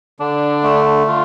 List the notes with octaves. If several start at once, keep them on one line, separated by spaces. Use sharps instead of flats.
D3 D4
A3
D3 F4